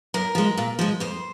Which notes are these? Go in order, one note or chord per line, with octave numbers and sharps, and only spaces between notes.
F#2 A#4
F3 G#3
A#2
F3 G#3
F2 C5